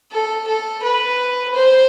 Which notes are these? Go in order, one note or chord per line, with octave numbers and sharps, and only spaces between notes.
A4
A4
B4
C5